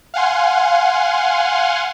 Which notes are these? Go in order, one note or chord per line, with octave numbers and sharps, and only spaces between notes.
F5 F#5 G#5 C6